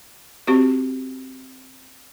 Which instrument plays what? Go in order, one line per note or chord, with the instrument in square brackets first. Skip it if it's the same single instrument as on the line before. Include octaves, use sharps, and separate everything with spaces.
[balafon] C4 F#4 G4